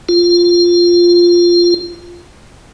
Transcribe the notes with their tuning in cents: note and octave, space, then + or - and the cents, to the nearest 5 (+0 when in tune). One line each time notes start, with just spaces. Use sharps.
F4 +0